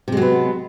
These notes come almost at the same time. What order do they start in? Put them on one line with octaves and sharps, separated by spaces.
C3 G#3 F#3 B3